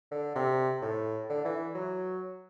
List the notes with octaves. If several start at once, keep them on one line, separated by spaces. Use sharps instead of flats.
D3
C3
A2
D3
E3
F#3